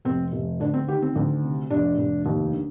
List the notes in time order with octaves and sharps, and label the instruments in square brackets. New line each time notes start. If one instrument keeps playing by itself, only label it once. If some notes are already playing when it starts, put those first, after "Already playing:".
[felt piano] F1 C4
F1
D2 D4
C4
D#3 G4
C4
D2
C3
F1 D4
F1
D#2
D3